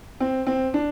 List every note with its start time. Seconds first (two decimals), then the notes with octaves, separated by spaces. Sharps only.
0.20 C4
0.47 C4
0.74 D4